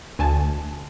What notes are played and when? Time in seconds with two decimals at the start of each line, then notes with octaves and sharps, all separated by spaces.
0.19 D2 G#5 A5